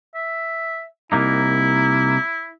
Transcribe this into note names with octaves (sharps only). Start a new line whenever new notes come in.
E5
C2 A#3 D#4 E4